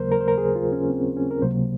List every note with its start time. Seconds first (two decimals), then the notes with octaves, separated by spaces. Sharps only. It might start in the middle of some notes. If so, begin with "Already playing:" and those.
Already playing: D#2 C#3 F#3 A#3 A#4 C5
0.12 A#4
0.21 C5
0.28 A#4
0.38 G#4
0.56 F4
0.72 C#4
0.90 C4
1.17 C#4
1.31 A#4
1.42 C#2 C3 F#3 A#3 C5